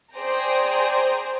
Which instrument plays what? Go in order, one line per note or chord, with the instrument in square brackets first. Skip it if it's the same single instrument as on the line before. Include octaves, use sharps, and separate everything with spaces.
[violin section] G#4 C5 D5 G5 G#5 A#5